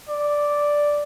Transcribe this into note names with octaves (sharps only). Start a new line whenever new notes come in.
D5